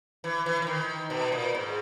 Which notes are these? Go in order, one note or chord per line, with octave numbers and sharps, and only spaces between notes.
E3
E3
E3
D#3
B2
A#2
G#2